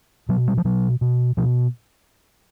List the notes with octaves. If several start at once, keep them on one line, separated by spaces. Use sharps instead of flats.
B2 F#3
G3
F3
B2 F#3
B2
B2 F3